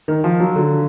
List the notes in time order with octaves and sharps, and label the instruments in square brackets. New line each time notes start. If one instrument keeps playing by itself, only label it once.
[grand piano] D#3
F3
F#3
D3